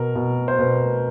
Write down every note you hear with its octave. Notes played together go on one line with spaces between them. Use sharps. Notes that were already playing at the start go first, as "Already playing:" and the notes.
Already playing: B2 A#4
B2
C5
B2 B4